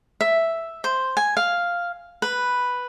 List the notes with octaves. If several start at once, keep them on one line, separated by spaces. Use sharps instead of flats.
E5
C5
G#5
F5
B4